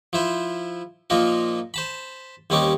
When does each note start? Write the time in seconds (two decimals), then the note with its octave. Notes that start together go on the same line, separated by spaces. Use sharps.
0.13 F3 E4 C5
1.10 A#2 F3 A#3 D#4 A#4
1.74 C5 A5 B5
2.50 D#2 G3 C4 C#4 D#4 D6